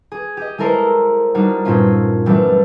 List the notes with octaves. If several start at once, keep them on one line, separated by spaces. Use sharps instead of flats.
G#4
G4 D#5
G#3 E4 A4 A#4 C5
G3 A#3 D4 D#4 F#4
G2 A#2 A3 C4 C#4 F4
F#2 E3 G3 A3